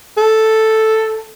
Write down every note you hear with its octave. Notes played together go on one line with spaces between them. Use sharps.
A4